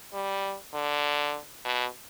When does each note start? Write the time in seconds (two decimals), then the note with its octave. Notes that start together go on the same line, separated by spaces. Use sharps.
0.13 G3
0.74 D3
1.65 B2